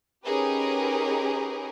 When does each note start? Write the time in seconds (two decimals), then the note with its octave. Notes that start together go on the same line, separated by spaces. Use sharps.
0.23 C#4 D#4 G4 G#4 A#4 B4